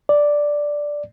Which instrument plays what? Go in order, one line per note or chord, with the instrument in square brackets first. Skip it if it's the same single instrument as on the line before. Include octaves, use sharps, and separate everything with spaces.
[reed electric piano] D5